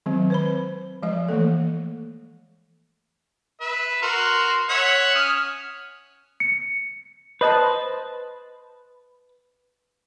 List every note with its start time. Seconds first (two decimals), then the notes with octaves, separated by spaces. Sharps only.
0.06 D#3 F#3 G#3 C4
0.30 B4 C5 B5
1.03 F3 G#3 D#5
1.29 E3 A3 A#3 A4
3.61 B4 E5
4.02 F#4 A#4 C6
4.69 C#5 E5 F#5
5.15 C#4 D#6 F6
6.40 C#7
7.41 B4 C5 D#5 A5